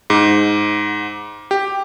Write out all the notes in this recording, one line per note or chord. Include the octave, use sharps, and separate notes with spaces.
G#2
G4